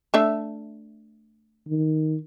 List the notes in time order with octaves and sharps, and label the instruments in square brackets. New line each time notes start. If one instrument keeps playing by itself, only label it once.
[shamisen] A3 D4 E5
[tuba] D#3